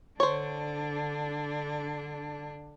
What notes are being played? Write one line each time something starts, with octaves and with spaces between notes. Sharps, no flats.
D3 D4 C5 C#5